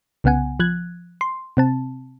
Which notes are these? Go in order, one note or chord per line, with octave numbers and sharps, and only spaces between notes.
C2 C#3 B3 F#5 G#5
F3 F#6 G#6
C6
C3 C4 A5